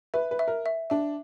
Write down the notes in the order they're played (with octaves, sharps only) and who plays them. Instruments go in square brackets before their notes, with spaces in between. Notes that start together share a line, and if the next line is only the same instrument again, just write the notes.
[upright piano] B4 [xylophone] E5
[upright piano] B4
[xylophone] E5
[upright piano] A#4
[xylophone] E5
[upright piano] D4 [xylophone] E5